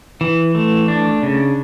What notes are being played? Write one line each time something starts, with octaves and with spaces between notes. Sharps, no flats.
E3
A3
D4
C#3